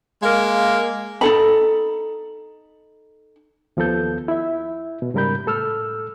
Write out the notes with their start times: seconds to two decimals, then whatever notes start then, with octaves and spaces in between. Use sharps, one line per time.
0.23 G#3 A#3 A#4 F5
1.21 D#4 A4 B5
3.77 D#2 F3 B3 A4 G6
4.28 E4 E5
5.02 B2
5.14 G#2 C#3 G3 A#4 B5 G6
5.46 A2 A4 E6 F6